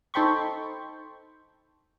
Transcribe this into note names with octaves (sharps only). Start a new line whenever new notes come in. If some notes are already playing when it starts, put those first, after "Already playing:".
D#4 A4 C5 G5 B5 C#6